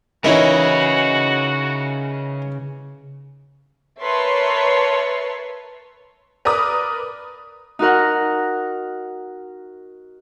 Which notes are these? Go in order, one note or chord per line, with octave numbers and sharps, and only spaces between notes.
C#3 E3 C#4 D#4 E4 F#4 A#4 D#5
A#4 B4 C#5 E5 A5 C6
A#4 B4 D5 D6 D#6
D#4 F#4 A#4 F#5